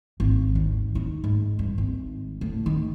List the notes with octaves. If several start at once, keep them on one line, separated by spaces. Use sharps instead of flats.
G#1
D#2
D#4
G#2
G2
G#1
A2
D#3